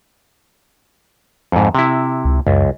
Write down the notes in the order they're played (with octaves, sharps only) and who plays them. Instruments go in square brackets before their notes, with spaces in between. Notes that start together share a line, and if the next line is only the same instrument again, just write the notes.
[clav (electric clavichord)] F2 G#2
C3 E4
[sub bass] C#2
[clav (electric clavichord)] C#2 [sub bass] F#2